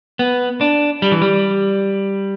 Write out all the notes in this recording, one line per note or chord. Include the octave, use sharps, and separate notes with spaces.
B3
D4
G3
E3
G3